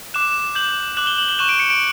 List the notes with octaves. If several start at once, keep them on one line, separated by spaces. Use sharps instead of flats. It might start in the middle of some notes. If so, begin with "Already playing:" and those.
D6 F#6 E7
D6 G6 F#7
D6 F#6 F#7
G7
F#7
G7
C#6 F#6 E7
D7
C#7
D7